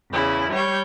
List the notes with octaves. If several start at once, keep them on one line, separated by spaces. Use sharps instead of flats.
E2 C#3 E4
G3 C#5 C#6 G6